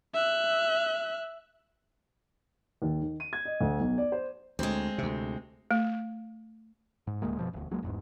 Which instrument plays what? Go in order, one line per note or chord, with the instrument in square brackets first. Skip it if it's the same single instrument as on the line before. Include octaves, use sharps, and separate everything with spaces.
[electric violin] E5 F#6
[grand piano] D#2
D#3
D#7
G#6
D#5
D2
B1
D5
C5
[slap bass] D2 [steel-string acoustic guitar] G#3 C4
[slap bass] D2 C3
[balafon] A3
[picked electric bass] G#2
D#1 D2 G#3 A#3
F#2 B2 F3
E1 D2
C#2 F#3 G#3 A#3
G1 E2 G#2